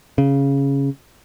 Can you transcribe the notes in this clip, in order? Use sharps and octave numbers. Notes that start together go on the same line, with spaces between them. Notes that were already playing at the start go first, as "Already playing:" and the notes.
C#3